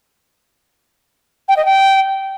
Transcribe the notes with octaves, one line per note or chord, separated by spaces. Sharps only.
G5
D#5
G5